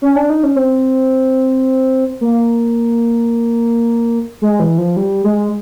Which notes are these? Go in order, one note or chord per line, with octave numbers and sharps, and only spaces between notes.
C#4
D4
D#4
C#4
C4
A#3
G#3
E3
F3
G3
G#3